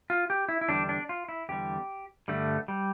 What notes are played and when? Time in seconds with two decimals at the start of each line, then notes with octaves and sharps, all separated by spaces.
0.10 F4
0.30 G4
0.49 E4
0.61 E4
0.68 E2 D3 G3 D4
0.89 D4
1.09 F4
1.29 E4
1.49 E2 D3 G3 G4
2.28 G2 D3 G3 A3
2.68 G3